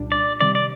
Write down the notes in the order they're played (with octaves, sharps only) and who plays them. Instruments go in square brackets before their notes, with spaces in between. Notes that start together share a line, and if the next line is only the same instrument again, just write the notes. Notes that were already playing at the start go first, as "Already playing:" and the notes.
Already playing: [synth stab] C2 A#2 G3 D4
[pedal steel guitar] D5
[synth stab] C3 D#3 G3 [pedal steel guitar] D5
[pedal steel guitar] D5